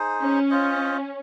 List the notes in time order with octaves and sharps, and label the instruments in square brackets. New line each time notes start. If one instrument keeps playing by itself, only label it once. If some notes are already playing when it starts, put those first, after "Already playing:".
Already playing: [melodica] D#4 G#4 C5
[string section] C#4
[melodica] F4 C5 D#5